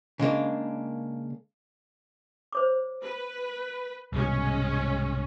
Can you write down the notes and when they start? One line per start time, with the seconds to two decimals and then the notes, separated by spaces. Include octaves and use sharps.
0.19 C#3 G#3 A#3 D4
2.52 C5 C#5 D6
3.02 B4
4.12 C2 G#2 B2 G#3 C#4